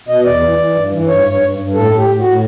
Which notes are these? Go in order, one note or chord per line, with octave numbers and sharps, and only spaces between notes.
B2 D#5
E2 D5
E3
E3
G2
E3
G2 C#5
G2
C#5
G2
G2
A2 A4
A2
G4
A2
F#4
A2